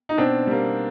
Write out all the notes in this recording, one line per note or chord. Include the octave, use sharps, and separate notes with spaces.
D#4
B2 C4 D4
G3 A#3